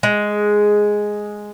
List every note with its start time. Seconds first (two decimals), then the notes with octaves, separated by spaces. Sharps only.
0.03 G#3